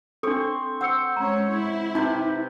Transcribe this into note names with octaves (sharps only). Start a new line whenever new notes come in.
C4 D4 A4 C#6
C5 F#5 E6 C#7
G#3 C#4 C#5 A#5
E4
C3 D#4 G4 B4